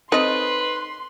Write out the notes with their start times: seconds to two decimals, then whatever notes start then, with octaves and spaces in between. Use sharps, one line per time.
0.12 C4 D#4 A4 B4 C#5 D#5 C6